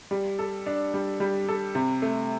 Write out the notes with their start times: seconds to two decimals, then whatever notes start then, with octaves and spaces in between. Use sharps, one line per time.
0.11 G3
0.39 A4
0.66 D4
0.94 G3
1.20 G3
1.49 A4
1.75 C3
2.02 A3